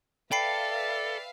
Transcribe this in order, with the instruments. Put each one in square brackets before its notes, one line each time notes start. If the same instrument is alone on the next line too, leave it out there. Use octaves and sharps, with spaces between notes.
[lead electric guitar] A4 [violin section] B4 E5 F5 [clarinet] D5 [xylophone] G5 B5 C7